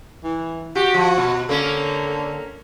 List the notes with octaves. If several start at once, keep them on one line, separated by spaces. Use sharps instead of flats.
E3
F#4 G4
F3
B2
D3 A#3 C#4